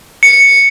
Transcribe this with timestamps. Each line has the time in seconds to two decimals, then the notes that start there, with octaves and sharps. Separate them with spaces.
0.23 C#7